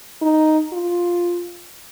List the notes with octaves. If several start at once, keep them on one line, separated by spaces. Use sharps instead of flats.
D#4
F4